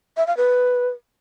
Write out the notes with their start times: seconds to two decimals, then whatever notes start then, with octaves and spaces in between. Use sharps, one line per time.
0.17 E5
0.27 F5
0.37 B4